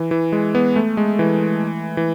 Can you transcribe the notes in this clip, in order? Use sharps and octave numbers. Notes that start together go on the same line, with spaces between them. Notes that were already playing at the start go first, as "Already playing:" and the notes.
Already playing: E3
E3
G#3
B3
A3
G#3
E3
E3